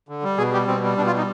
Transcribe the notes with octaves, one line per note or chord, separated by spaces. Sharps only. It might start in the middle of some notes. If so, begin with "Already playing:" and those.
D3
G3
B2 G#4
G3 G4
B2 C4
G3
B2 D4
F4
G3 D#4